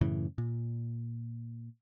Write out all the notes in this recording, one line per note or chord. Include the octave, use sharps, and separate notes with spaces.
F#2 A2 C#3 E3
A#2